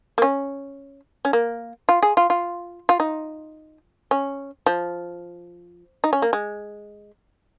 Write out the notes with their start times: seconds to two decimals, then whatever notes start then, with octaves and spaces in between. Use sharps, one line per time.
0.18 A#3
0.22 C#4
1.25 C#4
1.33 A#3
1.89 F4
2.02 G#4
2.17 F4
2.30 F4
2.89 F4
3.00 D#4
4.11 C#4
4.66 F3
6.04 D#4
6.13 C#4
6.22 A#3
6.33 G#3